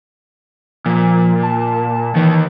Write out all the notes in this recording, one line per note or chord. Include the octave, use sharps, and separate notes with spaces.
A#2 F3
A5
D#2 D#3 E3